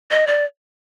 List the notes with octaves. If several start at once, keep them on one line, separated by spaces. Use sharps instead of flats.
D#5
D5